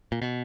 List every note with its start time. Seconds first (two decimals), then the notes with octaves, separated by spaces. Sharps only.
0.12 A#2
0.22 B2